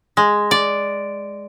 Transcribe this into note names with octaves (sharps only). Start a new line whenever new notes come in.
G#3
D5